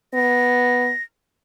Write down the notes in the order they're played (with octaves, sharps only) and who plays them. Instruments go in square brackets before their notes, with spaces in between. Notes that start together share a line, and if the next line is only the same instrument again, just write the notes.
[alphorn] B3 [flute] A#6